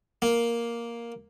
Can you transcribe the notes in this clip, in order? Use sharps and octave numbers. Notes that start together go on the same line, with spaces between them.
A#3